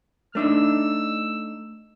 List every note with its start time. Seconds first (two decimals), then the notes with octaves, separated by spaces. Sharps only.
0.35 A3 D4 D#4 E6